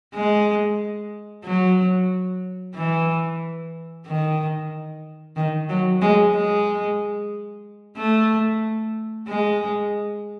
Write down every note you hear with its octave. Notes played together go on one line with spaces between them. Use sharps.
G#3
F#3
E3
D#3
D#3
F#3
G#3
G#3
A3
G#3